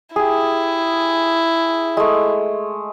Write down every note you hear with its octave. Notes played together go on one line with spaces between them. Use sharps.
E4 G4 G#4
G#3 A3